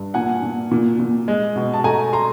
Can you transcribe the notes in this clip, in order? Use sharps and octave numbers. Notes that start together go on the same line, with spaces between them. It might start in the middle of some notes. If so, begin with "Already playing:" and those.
Already playing: G2
A#2 F#5 G#5
A#2
A#2
A#2
G#3
B2
A5
A3 G#5 A#5
A#5 C6